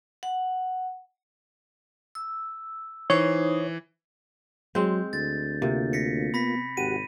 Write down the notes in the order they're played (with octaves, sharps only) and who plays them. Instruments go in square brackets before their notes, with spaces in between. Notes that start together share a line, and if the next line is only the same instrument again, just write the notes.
[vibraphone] F#5
E6
[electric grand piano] E3 [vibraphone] D#4 C5 D#6 [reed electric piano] C#5
[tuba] F#3 [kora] G#3 C4 [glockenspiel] G6
[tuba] D2 [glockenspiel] A6
[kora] C3 [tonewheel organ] A#3 F4
[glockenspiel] A#6 B6 C#7
[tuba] B3 [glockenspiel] B5 A#6 B6
[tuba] G#1 [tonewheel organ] F#4 G4 F#5 [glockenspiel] D#7